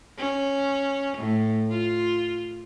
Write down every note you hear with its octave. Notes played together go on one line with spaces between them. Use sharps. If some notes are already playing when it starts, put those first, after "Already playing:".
C#4
A2
F4